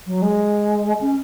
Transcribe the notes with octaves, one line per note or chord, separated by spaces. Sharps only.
F#3
G#3
C#4